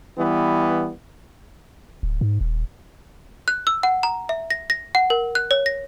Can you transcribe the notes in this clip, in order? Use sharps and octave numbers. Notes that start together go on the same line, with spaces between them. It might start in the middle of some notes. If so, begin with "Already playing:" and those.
E3 G3 B3
D1
G#2
D#1
F#6
E6
F#5
A#5
E5
A#6
A#6
F#5
A#4
F#6
C#5
A#6